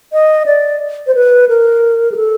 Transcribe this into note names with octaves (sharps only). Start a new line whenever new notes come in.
D#5
D5
C5
B4
A#4
G#4
A4